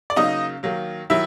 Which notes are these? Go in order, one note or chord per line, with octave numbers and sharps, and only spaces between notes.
D5
C#3 F#3 A#3 D#4 D#5
D#3 F#3 A#3
D#3 F#3 E4 E5